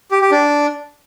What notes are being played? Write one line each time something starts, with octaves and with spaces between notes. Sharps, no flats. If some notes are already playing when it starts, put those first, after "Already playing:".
G4
G4
D4